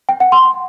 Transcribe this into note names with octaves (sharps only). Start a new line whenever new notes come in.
G5
F#5
C6